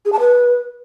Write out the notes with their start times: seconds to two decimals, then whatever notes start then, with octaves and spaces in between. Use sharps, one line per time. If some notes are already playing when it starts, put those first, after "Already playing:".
0.05 G#4
0.12 A5
0.20 B4